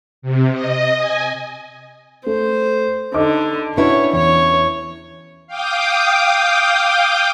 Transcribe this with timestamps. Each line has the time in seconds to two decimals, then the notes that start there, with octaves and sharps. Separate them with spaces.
0.22 C3
0.53 D#5
0.97 G#5
2.26 A3 C5
3.14 D3 D#4 D#5 D6
3.77 C#4 D4 E4 F#4 B4 C#5
4.13 E2 C#5
5.47 F5 G5 D6 D#6 G6